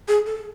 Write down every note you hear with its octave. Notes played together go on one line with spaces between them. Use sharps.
G#4
A4